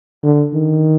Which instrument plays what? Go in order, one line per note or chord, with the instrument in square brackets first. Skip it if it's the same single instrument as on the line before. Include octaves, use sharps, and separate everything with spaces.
[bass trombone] D3
D#3